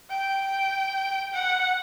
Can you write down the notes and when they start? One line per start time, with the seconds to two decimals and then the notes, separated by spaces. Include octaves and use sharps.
0.09 G5
1.33 F#5